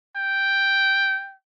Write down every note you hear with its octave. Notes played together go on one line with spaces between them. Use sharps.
G5